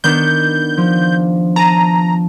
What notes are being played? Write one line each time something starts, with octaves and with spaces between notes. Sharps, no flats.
D#3 B3 D4 G6
F3
A5 A#5 D#7